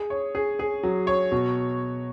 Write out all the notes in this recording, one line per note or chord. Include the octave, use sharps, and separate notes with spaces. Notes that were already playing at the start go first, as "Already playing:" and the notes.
Already playing: G#4
C#5
G#4
G#4
F#3
C#5
B2